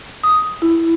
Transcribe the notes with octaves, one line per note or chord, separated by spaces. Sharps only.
D#6
E4